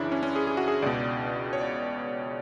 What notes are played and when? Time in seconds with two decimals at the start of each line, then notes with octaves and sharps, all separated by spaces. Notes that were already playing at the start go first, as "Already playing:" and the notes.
Already playing: F#2 C#3 E3 C#4 D4 E4
0.12 C#4
0.23 C#4
0.36 G#4
0.47 G#4
0.57 F#4
0.68 G#4
0.82 C#2 B2 D5
1.53 C#5
1.61 D5